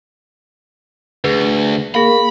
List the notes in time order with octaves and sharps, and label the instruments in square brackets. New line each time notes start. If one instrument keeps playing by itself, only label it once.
[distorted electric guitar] D2 [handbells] G#4 B4
[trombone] A#3 [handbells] G#4 F5 [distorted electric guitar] B5